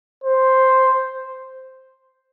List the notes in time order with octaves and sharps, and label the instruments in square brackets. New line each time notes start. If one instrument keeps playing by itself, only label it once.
[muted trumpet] C5